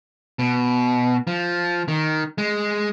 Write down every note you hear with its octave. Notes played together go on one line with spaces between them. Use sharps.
B2
F3
D#3
G#3